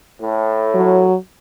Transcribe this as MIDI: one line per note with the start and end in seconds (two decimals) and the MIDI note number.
0.21 1.09 45
0.74 1.16 54